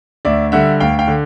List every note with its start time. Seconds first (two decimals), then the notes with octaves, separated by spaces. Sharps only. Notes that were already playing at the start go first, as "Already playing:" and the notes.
0.25 D2 D5 E5
0.52 D3 G3 E5 F#5
0.80 D2 F5 G5
0.99 F5 G5
1.08 D3